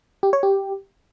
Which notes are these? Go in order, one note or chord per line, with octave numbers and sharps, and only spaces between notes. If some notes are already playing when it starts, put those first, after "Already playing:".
G4
C#5
G4